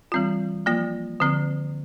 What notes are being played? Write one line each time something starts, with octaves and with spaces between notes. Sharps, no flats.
E3 G3 C4 F4
F3 A#3 F4
D3 F3 C4